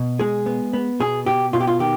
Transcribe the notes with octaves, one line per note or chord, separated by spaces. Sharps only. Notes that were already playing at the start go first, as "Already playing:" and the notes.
Already playing: B2
G#3 G#4
B3
B3
B2 G#4
B2 G4
B2 F4
G4
F4
D#3 G4